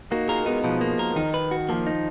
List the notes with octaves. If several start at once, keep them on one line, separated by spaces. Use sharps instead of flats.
A#3 D#4 F#4
F4 G#4 A#4
G#3 B3 D#4
B2 F3
A#3
A#4
D#3 D#4
B4
F#4
F3 A#3
D#4